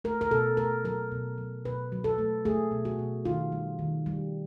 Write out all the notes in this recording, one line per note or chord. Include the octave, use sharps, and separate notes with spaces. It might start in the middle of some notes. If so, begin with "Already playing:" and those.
A3 A#4
A#4
B2 A4
A3 A#4
F#3 A#4
B2
F#3
B2 B4
F#3
A4
A3
A3 G#4
B2
F#4
B2
D#3 F4
G3
D#3
G3